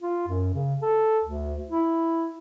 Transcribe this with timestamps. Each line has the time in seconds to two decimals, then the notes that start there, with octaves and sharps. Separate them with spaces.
0.02 F4
0.28 F#2
0.54 C#3
0.82 A4
1.24 D2
1.69 E4